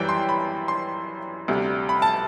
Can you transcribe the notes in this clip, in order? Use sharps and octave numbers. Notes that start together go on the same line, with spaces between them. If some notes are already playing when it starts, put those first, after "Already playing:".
Already playing: F#2 E3 G3 G5
C6
B5
C6
D2 C3 G3
B5
A5